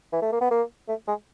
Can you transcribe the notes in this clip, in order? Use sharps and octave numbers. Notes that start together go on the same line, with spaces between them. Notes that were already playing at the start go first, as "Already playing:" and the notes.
E3
A3
A#3
B3
A#3
A3
G#3